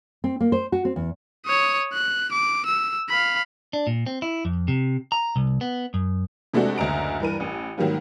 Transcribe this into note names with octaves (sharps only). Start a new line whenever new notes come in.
C4
A#3
C5
F#4
C4
E2
C#5 D#6
F#6
D6
E6
F5 B5
D4
A#2
C4
E4
F2
C3
A#5
C2
B3
F#2
C3 G#3 A3 D4 F#4
F#1 D2 D#5 A#5 D7
G2 E3 A#4 D#7
A1
G#2 D#3 F#3 G3 A#3